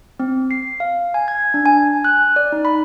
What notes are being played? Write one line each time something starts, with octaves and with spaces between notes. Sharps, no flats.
C4
C7
F5
G#5
G#6
D4
G#5
F#6
D5
D#4
B5